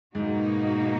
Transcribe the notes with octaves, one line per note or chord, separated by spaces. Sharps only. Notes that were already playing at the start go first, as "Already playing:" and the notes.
G#2 B2 A#3 D#4 F#4